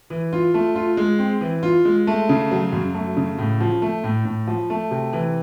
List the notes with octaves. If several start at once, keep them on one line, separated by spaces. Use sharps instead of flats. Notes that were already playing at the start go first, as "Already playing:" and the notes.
E3
F4
A3
F4
G#3
C4
E3
F4
G#3
A3
C#3
F#3
F#2
A3
C#3
A2
F3
A3
A2
A2
F3
A3
C3
E3